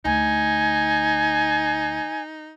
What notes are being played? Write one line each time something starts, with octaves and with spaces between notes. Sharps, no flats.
D2 D#4 G#5